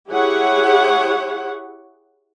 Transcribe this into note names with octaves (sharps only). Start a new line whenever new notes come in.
E4 G4 G#4 C#5 F#5